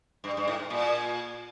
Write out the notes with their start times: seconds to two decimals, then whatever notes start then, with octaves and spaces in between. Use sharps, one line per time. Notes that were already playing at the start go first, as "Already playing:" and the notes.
0.24 G2
0.37 G2
0.48 A2
0.70 A#2